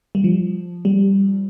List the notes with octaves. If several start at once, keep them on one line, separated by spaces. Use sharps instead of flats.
G3
F3
G3